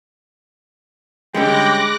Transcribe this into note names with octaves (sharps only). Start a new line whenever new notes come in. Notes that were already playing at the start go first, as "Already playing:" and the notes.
D3 G3 G#3 C#4 G5 D6 F#6 A#6